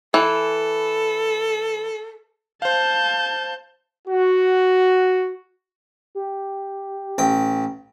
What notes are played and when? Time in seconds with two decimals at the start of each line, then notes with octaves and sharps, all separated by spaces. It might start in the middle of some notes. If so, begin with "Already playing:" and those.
0.14 E3 A4
2.62 C5 F5 A5 G6
4.07 F#4
6.15 G4
7.18 A1 G5